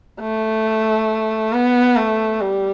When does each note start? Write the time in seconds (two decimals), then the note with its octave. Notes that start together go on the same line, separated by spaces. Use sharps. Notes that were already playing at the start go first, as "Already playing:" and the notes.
0.21 A3
1.52 B3
1.97 A3
2.41 G3